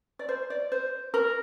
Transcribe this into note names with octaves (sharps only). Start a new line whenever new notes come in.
D5
C5
D5
C5
A#4